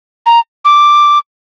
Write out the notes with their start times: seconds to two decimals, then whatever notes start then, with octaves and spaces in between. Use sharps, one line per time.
0.26 A#5
0.65 D6